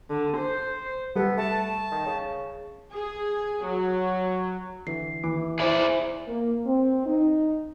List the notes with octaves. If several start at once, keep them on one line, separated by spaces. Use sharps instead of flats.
D3
C5
G3 B3 A4
A3 A5
D#3
C#3
G#4
F#3
D3 E3 C7
D#2 E3 D6
E4 G#4 B4 C5 D5 E5 G#6 A6
A#3
C4
D#4